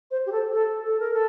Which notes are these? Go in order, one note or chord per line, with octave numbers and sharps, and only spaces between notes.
C5
G4
A4
A4
A4
A#4
A4